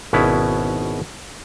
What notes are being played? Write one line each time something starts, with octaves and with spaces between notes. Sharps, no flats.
G#1 B2 B3 C#4 E4 B4